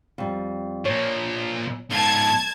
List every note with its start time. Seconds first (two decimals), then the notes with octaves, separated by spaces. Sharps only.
0.18 F2 G3
0.85 A#2 F3 C#5
1.90 G#2 F4 A5 G#6